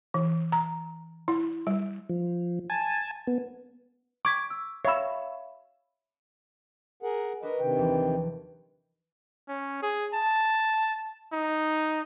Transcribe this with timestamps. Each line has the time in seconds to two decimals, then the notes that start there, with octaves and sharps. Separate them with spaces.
0.14 E3
0.52 A#5
1.28 E4
1.67 G3
2.09 F3
2.70 G#5 A5
3.27 B3
4.25 C#6 D6 G#6 B6
4.50 E6
4.85 C#5 E5 F5 B5 E6
7.03 G#4 A#4 F#5
7.42 D4 F#4 A#4 B4 D#5
7.60 C3 D#3 G5
7.77 D#2 E3 F3
9.48 C#4
9.83 G#4
10.13 A5
11.33 D#4